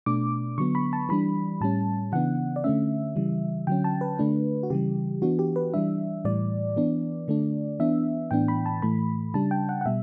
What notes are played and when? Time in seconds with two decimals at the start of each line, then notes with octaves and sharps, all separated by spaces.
0.06 B2 A3 D4 D6
0.58 D3 F#3 B3 C#6
0.75 B5
0.93 A5
1.09 E3 G3 D4 B5
1.61 A2 G3 C#4 A5
2.12 C#3 E3 B3 D4 F#5
2.56 D5
2.64 D3 A3 C#4 E5
3.16 C#3 E3 G3
3.67 D3 F#3 C#4 G5
3.84 A5
4.01 B4
4.19 D3 A3 D4
4.63 F#4
4.70 C#3 E3 G3 G4
5.22 E3 B3 D4 F#4
5.39 G4
5.56 B4
5.74 E3 G3 D4 E5
6.25 A2 E3 G3 D5
6.76 E3 B3 D4
7.28 D3 A3 D4
7.80 E3 B3 D4 E5
8.31 A2 E3 B3 D4 G5
8.48 B5
8.66 A5
8.82 A2 E3 A3 B5
9.34 C#3 G3 D4 A5
9.51 G5
9.69 F#5
9.81 F#5
9.86 B2 G3 E5